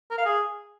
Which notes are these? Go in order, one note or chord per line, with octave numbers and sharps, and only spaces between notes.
A#4
F5
G#4